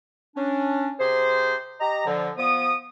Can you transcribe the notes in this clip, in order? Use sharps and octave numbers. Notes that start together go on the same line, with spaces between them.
C#4 D4
C3 G#4 C5
G4 D#5 A#5
D3 F3
F3 B3 D#6